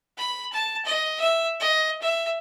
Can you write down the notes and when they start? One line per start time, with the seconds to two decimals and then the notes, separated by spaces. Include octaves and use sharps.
0.18 B5
0.53 A5
0.85 D#5
1.20 E5
1.60 D#5
2.02 E5